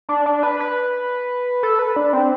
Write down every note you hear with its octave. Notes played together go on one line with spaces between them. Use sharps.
D4
D4
B4
B4
A4
B4
D4
C4